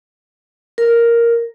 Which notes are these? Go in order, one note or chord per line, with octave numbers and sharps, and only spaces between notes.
A#4